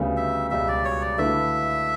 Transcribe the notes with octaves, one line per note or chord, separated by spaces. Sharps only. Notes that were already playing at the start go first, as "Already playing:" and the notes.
Already playing: D2 C#3 G3 B3
E5
C#2 B2 G3 E5
D5
C#5
D5
D3 A3 E4 B4 E5